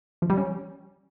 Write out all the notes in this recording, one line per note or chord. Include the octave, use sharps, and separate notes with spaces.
F3
G3
C#4